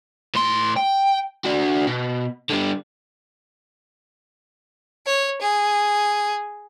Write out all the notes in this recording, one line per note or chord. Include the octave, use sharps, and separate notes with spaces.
A2 C6
G5
D4 F#4
B2
D3 G3
C#5
G#4